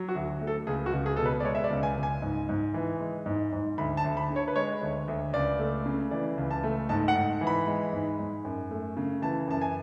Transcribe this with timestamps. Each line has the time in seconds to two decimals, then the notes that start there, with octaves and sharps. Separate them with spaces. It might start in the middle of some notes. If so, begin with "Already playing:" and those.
Already playing: F#3
0.09 F#4
0.15 D2
0.41 A3
0.47 A4
0.67 C#2 G#4
0.86 F#4
0.93 C#2
1.06 G#4
1.16 B2 A4
1.26 B4
1.40 D5
1.45 G#3 C#5
1.55 E5
1.64 D5
1.71 C#2
1.83 G#5
1.97 C#2
2.03 G#5
2.22 G#2
2.49 G#2
2.74 E3
3.00 G#3
3.26 G#2
3.52 G#2
3.78 D2 B5
3.97 A5
4.04 D2
4.17 B5
4.30 D3
4.36 C#5
4.48 B4
4.56 G#3 C#5
4.82 D2
5.08 D2
5.33 C#2 D5
5.59 A3
5.86 C#3
6.11 E3 D5
6.37 C#2
6.51 A5
6.63 A3
6.89 G#2 A5
7.08 F#5
7.15 G#2
7.41 E3
7.47 B5
7.67 G#3
7.93 G#2
8.19 G#2
8.45 F#2
8.71 A3
8.97 C#3
9.22 E3 A5
9.48 F#2 A5
9.61 G#5